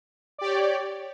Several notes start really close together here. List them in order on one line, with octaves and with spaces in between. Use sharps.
D5 G4 C#5